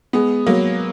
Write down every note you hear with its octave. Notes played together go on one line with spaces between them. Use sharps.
G#3 B3
F#3 A#3